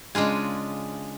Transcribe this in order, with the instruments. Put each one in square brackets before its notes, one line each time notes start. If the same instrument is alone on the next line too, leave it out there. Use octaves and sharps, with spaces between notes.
[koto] C#3 G#3 D4 F4 G#4